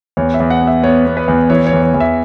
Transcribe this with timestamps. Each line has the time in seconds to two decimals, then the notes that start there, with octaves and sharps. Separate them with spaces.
0.17 E2 C#5
0.34 E5
0.40 E2
0.50 F#5
0.61 B3
0.67 E5
0.83 B3 C#5
1.06 B3
1.17 B4
1.28 E2
1.50 E3 C#5
1.67 C#5
1.73 E2
1.83 C#5
1.94 E2
2.00 E5